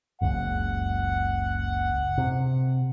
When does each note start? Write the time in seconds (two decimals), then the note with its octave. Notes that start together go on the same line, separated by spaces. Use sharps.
0.21 F#1 C#2 F#5
2.18 C3